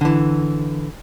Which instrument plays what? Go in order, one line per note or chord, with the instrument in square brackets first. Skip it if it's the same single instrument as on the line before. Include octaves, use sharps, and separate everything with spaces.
[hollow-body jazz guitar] D3 E3